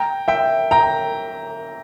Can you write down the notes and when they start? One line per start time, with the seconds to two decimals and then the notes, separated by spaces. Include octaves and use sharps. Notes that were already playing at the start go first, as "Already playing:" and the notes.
Already playing: G5 A#5
0.28 E5 G5
0.71 G5 A#5